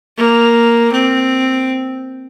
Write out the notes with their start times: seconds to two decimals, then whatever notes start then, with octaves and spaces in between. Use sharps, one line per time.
0.17 A#3
0.92 C4